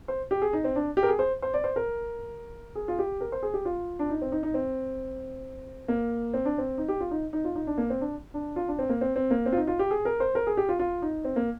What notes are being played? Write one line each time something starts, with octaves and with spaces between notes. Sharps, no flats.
C5
G4
G#4
D#4
C4
D4
G4
A#4
G#4
C5
C5
D5
C5
A#4
G#4
F4
G4
A#4
C5
G#4
G4
F4
D4
D#4
C4
D#4
D#4
C4
A#3
C4
D4
C4
D#4
G4
F4
D#4
D#4
F4
D#4
D4
A#3
C4
D4
D4
F4
D4
C4
A#3
C4
C4
A#3
C4
F4
D#4
F4
G4
G#4
A#4
C5
A#4
G#4
G4
F4
F4
D#4
C4
A#3